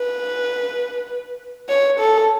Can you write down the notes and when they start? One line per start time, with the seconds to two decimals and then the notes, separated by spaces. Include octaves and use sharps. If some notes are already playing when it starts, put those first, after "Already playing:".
Already playing: B4
1.69 C#5
2.00 A4